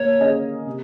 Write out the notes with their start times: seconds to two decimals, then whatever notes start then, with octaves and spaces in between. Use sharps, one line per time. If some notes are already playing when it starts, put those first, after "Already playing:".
Already playing: A#3 C#5
0.20 C#4 G#4 D#5
0.66 C3